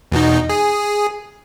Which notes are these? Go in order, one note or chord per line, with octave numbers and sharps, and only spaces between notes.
E2 B2 D#4
G#4